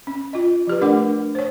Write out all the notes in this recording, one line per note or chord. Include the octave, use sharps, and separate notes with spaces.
C#4
F4 D#5
F3 G4 B4
A3 D4 A#4 D5 F#5 D6
C5 C#5